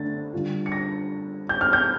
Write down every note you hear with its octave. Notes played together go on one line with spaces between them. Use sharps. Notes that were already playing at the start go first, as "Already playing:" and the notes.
Already playing: D3 A3 A6
D3 G3 D4 F4
C#7
A#6
G6
F6
G6